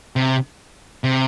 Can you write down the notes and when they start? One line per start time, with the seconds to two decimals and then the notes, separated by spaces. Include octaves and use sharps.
0.16 C3
1.04 C3